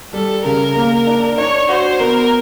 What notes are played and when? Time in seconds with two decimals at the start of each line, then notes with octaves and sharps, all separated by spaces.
0.13 G3 A4
0.45 C#3 A#4
0.76 A#3
1.07 D4
1.37 D4 C#5
1.69 F#4 C5
2.00 B3 A#4